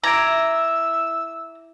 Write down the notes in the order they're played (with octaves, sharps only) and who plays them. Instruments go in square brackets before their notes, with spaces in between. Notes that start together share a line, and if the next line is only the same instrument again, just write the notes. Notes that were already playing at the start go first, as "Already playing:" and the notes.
[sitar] E4 [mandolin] A#5 [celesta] D6 G#6 D7 [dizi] E6